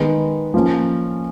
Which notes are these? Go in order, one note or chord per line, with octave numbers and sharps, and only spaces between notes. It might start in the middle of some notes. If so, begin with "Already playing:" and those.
Already playing: D#3 G#3 B3
F3 A#3 C#4